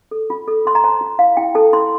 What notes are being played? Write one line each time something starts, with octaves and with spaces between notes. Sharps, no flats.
A4
F4
A4
F4 C6
A#5
C5 A5
F4
E4 F5
E4 G5
A4 A5
E4 C6